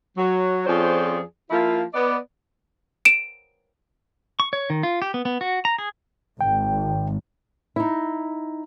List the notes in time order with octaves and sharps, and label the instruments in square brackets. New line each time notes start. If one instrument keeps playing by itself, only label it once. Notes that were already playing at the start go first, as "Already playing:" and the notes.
[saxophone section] F#3
F2 F3 C#4 G#4 C5 D5
F3 A#3 E4 F4
B3 D5 D#5
[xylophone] D7 E7
[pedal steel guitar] C#6
C#5
D#3
F4
G4
B3
B3
F#4
A#5
G#4
[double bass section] G#1 [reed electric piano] G5
[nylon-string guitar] D#4 E4